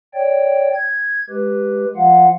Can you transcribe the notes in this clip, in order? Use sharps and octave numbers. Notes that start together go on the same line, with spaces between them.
C#5 D5 G5
G#6
G#3 G4 B4
F3 F4 F5 F#5